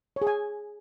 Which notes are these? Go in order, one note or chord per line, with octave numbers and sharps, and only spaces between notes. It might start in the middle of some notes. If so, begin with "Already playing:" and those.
C#5
G#4
G#5